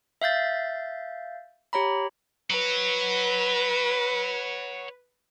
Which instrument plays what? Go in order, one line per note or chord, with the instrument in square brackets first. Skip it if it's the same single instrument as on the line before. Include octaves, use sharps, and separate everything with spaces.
[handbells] E5 F5 G6 A6
G4 C#5 A#5 B5
[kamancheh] B4 [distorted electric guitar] C#5 F#5